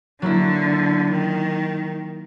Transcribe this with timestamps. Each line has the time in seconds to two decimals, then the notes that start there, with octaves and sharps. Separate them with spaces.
0.22 D3 F#3 A#3 E4
1.11 D#3